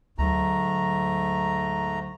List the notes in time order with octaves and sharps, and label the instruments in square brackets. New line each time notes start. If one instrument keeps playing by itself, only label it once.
[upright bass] D2 F#3 [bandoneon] G#2 A3 A#5